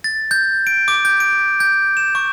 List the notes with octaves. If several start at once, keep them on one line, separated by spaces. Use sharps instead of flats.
A6
G6
D7
D6
G6
D7
G6
E7
C#6